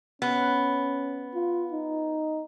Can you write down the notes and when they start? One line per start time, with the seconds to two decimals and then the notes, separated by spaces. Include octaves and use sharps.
0.22 B3 C#4
1.34 F4
1.72 D#4